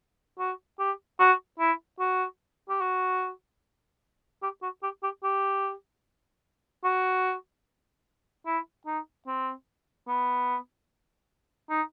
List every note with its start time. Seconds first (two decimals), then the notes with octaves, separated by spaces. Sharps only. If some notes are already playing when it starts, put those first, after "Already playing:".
0.39 F#4
0.79 G4
1.19 F#4
1.59 E4
2.00 F#4
2.69 G4
2.81 F#4
4.42 G4
4.62 F#4
4.82 G4
5.03 G4
5.23 G4
6.84 F#4
8.46 E4
8.86 D#4
9.27 C4
10.07 B3
11.69 D#4